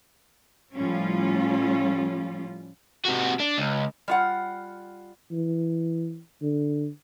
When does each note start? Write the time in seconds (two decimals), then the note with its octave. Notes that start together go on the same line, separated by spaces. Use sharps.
0.74 A2 F3 G3 C#4 F4
3.05 C3 F#4
3.40 D4
3.58 C#2
4.08 G3 F4 F#5
5.32 E3
6.42 D3